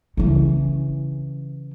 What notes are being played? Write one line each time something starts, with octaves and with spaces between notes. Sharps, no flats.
C#3 E3